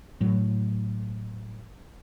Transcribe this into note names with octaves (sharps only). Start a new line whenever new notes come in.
A2 F#3